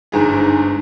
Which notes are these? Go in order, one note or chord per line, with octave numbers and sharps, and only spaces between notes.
G1 G#2 G#4